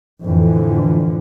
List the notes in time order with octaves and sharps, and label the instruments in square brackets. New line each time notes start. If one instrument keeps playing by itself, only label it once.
[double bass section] F2 A2 D3 E3